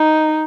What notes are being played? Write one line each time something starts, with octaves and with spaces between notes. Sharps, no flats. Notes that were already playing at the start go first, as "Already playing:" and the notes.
Already playing: D#4